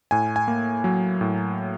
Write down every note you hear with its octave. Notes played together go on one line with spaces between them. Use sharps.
A2 G#5
G#5
A#3
F#3
A2